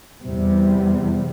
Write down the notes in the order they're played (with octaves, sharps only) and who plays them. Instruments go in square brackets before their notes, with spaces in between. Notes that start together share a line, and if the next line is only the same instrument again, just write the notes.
[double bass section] E2 C3 G3